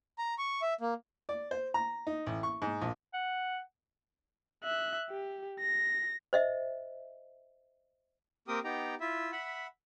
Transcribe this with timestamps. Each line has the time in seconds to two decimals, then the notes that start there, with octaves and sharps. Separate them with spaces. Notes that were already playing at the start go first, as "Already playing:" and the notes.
0.18 A#5
0.38 C#6
0.62 E5
0.81 A#3
1.29 D5
1.51 C5
1.74 A#5
2.07 D#4
2.26 A1
2.43 C#6
2.62 G#2
2.81 A#1
3.14 F#5
4.64 E5 F#6
5.10 G4
5.60 A#6
6.33 C5 D#5 E5
8.48 A#3 C4 G4 A#4 G5 D#6
8.64 B3 D#4 G4 G5 A#5
9.00 E4 F4 E5
9.32 E5 F#5 B5